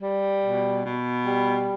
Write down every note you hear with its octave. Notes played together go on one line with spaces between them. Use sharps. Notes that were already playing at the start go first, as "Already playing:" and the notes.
G3
B2
B2
G3